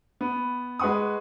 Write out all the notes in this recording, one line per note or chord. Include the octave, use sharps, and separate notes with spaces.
B3
G#3 B4 F#5 C#6 D#6